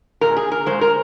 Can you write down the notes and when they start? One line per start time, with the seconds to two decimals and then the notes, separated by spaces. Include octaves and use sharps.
0.21 A#2 G#3 A#4
0.37 G#4
0.52 A#4
0.66 A#2 G#3 C5
0.81 A#4